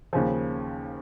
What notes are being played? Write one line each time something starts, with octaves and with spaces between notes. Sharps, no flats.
D#2 C#3 F3 G#5